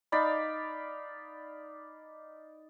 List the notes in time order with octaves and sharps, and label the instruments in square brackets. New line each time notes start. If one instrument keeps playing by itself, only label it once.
[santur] D#4 D5 F5 B5